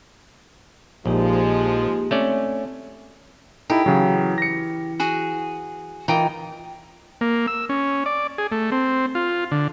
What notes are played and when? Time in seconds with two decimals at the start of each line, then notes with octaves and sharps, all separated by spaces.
1.06 A#1 F3 G#3 A#3 D#4 G4
2.11 A3 C4 C#4 D5
3.70 D#4 E4 G4 A4
3.86 C#3 E3 F#3
4.38 A#6 C#7
5.00 F#4 G#4
6.08 E3 D#4 F4 A#4 G5 D#6
7.21 A#3
7.47 E6
7.69 C#4
8.06 D5
8.38 G#4
8.52 A3
8.72 C4
9.15 F4
9.51 D3